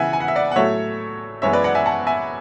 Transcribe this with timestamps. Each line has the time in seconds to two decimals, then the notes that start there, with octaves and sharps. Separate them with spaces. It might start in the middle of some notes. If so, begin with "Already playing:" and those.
Already playing: C#3 E3 B3 E5 F#5 G#5
0.13 G#5
0.20 F#5
0.28 E5
0.35 D5 F#5
0.52 F#5
0.56 A2 F#3 A3 C#5 E5
1.42 F#2 E3 G#3 B3 C#5 E5
1.53 B4 D5
1.64 D5 F#5
1.75 E5 G#5
1.86 F#5 A5
2.07 E5 G#5